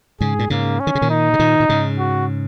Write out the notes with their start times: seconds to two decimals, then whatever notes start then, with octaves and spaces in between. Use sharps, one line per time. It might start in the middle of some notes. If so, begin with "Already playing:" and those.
0.21 G#2 C#3 G#4
0.39 A#2
0.50 G#2 C#3 A#3
0.80 C#4
0.87 D#3
0.95 C#3
1.02 A#2 D#3
1.10 D#4
1.34 C#3
1.39 A#2 D#3
1.60 A#2
1.69 G#2 C#3
1.99 F#4